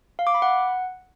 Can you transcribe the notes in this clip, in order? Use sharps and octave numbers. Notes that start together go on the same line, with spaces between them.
F5
D6
B5
F#5